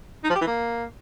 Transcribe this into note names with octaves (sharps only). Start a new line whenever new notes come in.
D#4
F3
G4
E3
A#3